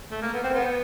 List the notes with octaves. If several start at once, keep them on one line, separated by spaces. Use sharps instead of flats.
A3
A#3
B3
C4
B3